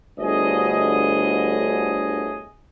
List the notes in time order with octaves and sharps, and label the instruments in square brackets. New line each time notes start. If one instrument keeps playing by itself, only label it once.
[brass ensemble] G1 D2 A2 G#4 D#5